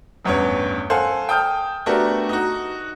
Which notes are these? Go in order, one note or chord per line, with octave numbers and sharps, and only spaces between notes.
A1 E2 G2 C#4 B4 C#5
A4 C5 F5 F#5 G#5
G5 A5 D#6 F6 G6
A3 B3 D4 F#4 G4 A#4
D#4 F#4